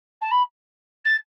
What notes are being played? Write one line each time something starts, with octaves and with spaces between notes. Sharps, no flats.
A5
B5
A6